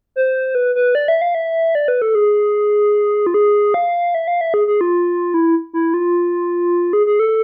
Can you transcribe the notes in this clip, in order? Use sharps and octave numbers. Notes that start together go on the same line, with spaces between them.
C5
B4
B4
D5
E5
F5
E5
D5
B4
A4
G#4
F4
G#4
F5
E5
F5
E5
G#4
G#4
F4
E4
E4
F4
G#4
G#4
A4